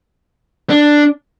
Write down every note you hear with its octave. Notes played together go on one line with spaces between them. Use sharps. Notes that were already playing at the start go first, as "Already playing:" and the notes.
D4